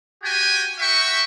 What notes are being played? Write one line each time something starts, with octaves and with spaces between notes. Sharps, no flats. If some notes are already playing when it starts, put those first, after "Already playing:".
F#4 G4 G5 G#5
F#4 E5 G5 C#6